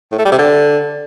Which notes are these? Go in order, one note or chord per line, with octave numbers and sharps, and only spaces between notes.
A2
A3
G3
C3
D3